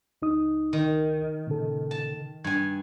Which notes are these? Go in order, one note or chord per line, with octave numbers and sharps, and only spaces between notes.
C#2 D#4 D#6
D#3
A#2 C#3 A4
A5
G2 G#5 G#6